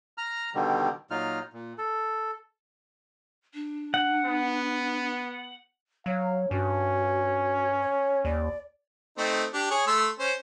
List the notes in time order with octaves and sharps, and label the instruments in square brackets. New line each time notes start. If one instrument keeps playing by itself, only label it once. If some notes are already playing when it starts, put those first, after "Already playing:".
[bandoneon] A#5 F6
B2 D3 D#3 G3
A#2 F#3 D#4 F4 F6
A#2
A4
[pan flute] D4
[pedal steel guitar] F#5
[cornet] B3
[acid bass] F#3 [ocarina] C#5 [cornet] F5
[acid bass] G2 [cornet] C#4 [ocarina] F#4
[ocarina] C#5
[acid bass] D#2 [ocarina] D5
[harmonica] A3 C4 D#4
D4 G4
G#4 C#5
A3 C6 E6
C#4 C5